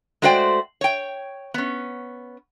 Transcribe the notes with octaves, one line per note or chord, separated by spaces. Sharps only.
G#3 A3 F#4 C5 D5 G5
C#5 G5
B3 C#4